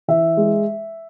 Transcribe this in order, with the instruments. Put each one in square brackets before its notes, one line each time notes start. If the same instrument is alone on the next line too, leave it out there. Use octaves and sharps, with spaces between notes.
[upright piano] E3 E5
G#3